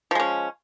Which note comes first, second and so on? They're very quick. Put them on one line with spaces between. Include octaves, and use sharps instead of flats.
F3 G#3 C#4